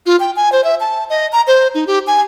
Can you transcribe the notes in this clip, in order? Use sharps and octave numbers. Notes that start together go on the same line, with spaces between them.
F4
G5
G#5
C5
E5
A5
D#5
A#5
C5
D#4
G4
G#5